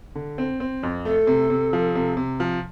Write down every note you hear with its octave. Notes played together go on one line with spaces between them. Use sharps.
D3
C4
C4
F2
A3 A4
C3
C3
F3
C3
C3
F3